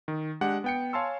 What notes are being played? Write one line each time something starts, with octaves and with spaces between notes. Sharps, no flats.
D#3
G#3 D4 G4 F#5
B3 G5 C#7
C#5 F5 G#5 A5 C6 E6